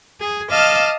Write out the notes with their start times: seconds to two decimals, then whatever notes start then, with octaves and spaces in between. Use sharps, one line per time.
0.21 G#4
0.51 D#5 F5 A5 D6 E6 F6